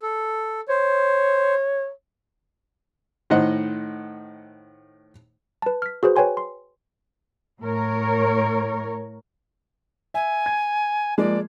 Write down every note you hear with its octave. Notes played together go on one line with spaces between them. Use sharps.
A4
C5 C#5
A2 D#3 C5 D#5 F#5
B4 A5
F6 B6
F#4 G#4 B4 C5
B4 C#5 G5 G#5 C6
C6
A2 A#4 C#5
E5 G#5
G#6
F3 G#3 A#3 D5